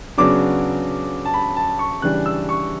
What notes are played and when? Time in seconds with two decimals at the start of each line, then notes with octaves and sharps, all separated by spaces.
0.18 C#3 F#3 B3 D4 D6
1.25 A5
1.34 B5
1.57 A5
1.79 C#6
2.02 C#3 E3 G3 D4 F#6
2.26 E6
2.49 C#6